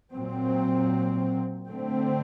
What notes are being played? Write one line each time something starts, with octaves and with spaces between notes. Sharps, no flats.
A#2 F#3 C4
D3 A3 C4